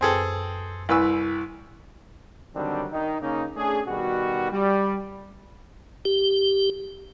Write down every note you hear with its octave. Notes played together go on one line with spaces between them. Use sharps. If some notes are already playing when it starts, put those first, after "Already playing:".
F#2 C4 G#4 A4 B4 G5
C2 E4 B4 G#5 C#6 E6
D3 D#3 F#3 G3 C4 D4
D#3 D#4
C#3 A#3 C#4 D#4
A3 C#4 D4 G#4
B2 D#3 G3 F#4
G3
G4